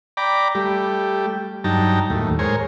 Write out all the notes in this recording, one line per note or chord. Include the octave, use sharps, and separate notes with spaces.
D5 G5 A#5 B5 D6
G3 A3 G4
G2 F#3 D#4 G5 A5 A#5
D#2 A2
G#3 A#4 C5 C#5 G#5